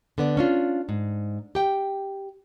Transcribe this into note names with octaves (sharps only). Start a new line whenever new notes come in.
D3 B3 D5
C#4 D4 F4
G#2
G4 G5